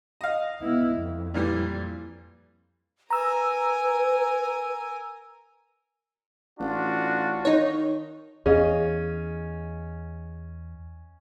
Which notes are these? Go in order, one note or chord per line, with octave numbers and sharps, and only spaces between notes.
D#5 F5
B3 E4
F2
A#2 E3 G3
A#4 B4 G#5 A#5 E6
A1 D4 F4 F#4
D#3 D#4 C#5
E2 C#4 G#4 D#5 F5